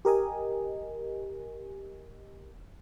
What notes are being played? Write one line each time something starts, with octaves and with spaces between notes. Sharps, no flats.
G4 A#4 D#5 G#5